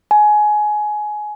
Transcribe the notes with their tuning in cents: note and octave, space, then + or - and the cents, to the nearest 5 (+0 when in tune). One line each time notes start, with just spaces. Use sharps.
G#5 +20